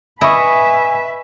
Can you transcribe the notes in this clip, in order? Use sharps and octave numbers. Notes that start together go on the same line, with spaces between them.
E4 B4 D#5 E5 G#5 C#6